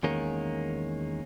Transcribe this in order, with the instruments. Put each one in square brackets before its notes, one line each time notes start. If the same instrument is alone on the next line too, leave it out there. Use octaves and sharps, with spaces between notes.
[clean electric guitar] E2 D#3 G#3 A#3 C#4